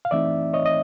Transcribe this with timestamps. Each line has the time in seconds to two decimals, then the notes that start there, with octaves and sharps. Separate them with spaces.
0.05 F5
0.11 E3 A3 C4 D#4 D5 E5
0.53 C#5 D#5
0.66 D#5